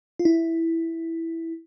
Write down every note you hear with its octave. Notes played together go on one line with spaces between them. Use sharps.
F4
E4